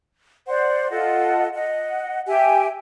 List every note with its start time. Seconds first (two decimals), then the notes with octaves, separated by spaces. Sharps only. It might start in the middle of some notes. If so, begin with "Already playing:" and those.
0.48 C5 D5 F#5
0.90 F4 A4 D#5 F#5
1.54 D#5 F#5
2.27 G4 E5 G5 G#5